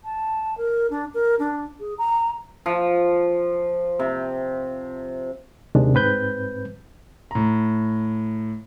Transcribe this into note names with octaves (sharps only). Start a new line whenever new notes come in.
A5
A#4
D4
A#4
D4
G#4
A#5
F3
C3
D#2 C3 D#3 G#3 D4
G#2 C4 B4 G6
A2 A#5